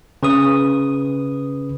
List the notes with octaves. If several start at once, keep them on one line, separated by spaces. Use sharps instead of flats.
C#3 B4 D#6